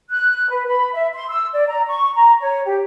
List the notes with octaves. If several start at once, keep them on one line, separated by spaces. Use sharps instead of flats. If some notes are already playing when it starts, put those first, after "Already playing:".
F#6
B4
B5
E5
C6
E6
D5
A#5
C#6
A#5
C#5
G4